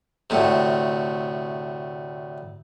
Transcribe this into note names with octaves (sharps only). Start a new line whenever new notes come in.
D2 A2 C3